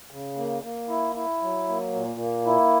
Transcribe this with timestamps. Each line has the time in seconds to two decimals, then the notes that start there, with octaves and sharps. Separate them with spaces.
0.11 C#3
0.37 A#3
0.63 A#3
0.89 E4
1.16 E4
1.42 F#3
1.68 A#3
1.94 A#2
2.20 A#3
2.46 E4